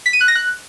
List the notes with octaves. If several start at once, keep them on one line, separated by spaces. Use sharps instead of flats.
B6
D#7
F#6
A#6
F#6